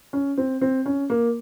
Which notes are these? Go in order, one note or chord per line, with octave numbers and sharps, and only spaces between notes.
C#4
C4
C4
C#4
A#3